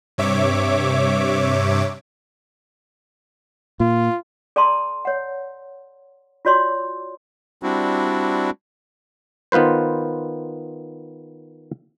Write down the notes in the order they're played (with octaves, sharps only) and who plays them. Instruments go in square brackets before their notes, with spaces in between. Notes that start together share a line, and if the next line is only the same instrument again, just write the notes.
[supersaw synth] G2 C3 C#5 E5 D6
[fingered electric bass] A#2 [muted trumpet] F4
[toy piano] A4 D5 G5 A5 A#5 C6
C#5 F#5
F4 F#4 C#5 D5 C6
[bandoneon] G3 C4 D4 E4 F#4
[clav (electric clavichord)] D#3 B3 F4 B4 C5